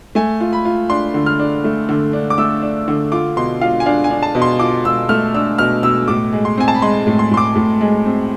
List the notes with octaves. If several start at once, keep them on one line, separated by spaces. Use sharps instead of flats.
A3 G#5
F4
B5
F4
D4 C6
D3
F6
D4
A3
D3
D4
D6
A3 E6
D4
D3
F4 D6
B2 C6
F4 F5
G#5
D4 F5
G#5
D4
A5
B2
C6
F4 D6
B2 E6
A3 F6
D4 E6
B2 F6
B2 E6
A2 D6
G#3
C6
C4 G#5
A5
B5
G#3 C6
A2
C6
A2 C6
D6
A2
G#3
C4